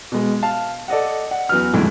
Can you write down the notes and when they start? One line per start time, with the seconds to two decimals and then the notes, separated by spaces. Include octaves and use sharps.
0.12 B2 G#3
0.43 F5 A5
0.88 A4 D5 D#5 F#5
1.31 F#5
1.49 E2 F#3 B4 F6
1.73 B1 F2 A2 D3 G#3